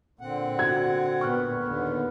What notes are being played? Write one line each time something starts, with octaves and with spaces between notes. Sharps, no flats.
A#2 D3 C4 F#5
F#4 G#6
A#2 B3 C#6 F6 F#6
D#2 D3 B3